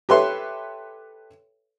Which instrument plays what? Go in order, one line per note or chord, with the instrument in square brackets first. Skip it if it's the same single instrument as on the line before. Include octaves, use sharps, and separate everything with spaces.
[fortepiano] G4 A4 B4 C#5 E5 C6